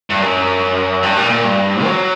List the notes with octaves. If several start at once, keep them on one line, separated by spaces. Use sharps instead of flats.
G2
F#2
G2
A#2
A#2
G2
F#3